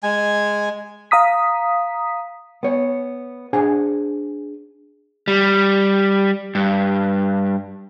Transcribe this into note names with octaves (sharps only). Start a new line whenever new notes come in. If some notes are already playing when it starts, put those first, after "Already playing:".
G#3 G#5
F5 A#5 D#6 B6
B3 C#5
D4 G#4 C5 F#5 G#5
G3
G2